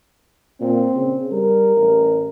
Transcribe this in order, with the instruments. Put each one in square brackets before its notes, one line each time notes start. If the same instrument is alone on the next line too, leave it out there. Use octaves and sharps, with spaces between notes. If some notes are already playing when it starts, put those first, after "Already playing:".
[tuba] A#2 [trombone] C4
[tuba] C#3
[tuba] G3 [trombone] A#4
[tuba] A1